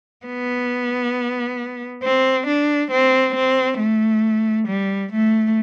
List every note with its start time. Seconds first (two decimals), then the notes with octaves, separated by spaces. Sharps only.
0.26 B3
2.03 C4
2.46 D4
2.91 C4
3.35 C4
3.80 A3
4.68 G3
5.12 A3